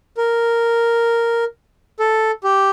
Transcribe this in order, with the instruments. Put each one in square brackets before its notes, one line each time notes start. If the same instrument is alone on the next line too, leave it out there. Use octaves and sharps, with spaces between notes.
[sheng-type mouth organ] A#4
A4
G4